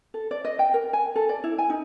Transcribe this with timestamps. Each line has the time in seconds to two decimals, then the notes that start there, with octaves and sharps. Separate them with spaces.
0.14 A4
0.31 D5
0.45 D#5
0.59 G5
0.74 A#4
0.93 G#5
1.16 A4
1.29 D5
1.44 E4
1.58 G#5
1.70 D#4